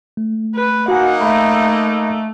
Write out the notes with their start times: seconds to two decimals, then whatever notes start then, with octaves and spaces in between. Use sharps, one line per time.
0.17 A3
0.55 B4
0.88 A#3 D#4 F#4 F#5 G#5
1.21 A3 E5 F5 B5